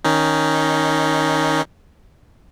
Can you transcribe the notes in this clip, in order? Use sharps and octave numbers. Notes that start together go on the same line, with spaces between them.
D#3 C#4 D#4